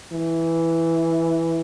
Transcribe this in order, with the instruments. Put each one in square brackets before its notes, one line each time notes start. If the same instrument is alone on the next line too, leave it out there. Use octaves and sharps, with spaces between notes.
[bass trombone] E3